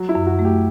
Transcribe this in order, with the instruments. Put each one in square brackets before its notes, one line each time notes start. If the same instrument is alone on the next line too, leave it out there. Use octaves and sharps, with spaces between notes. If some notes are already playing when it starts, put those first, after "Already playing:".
Already playing: [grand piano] F#3
E4
[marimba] F#2
[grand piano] F#4
[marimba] A3
[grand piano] G4